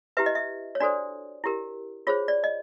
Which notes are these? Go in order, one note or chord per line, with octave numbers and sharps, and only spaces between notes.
E4 G4 B4 E5
D#5
E5
C#5
D4 F#4 A4 C5 D5
E4 G4 A#4
F4 G#4 C5 C#5
D5
D#5